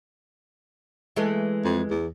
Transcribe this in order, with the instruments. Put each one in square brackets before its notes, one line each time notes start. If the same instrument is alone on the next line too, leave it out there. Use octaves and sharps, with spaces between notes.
[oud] E3 G#3 A3
[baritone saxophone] F2
E2